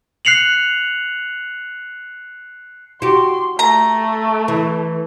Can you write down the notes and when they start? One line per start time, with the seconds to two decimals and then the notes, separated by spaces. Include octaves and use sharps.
0.25 F#6 C7 C#7 F7 F#7
3.02 F#4 G4 C6
3.59 A3 A#5
4.48 E3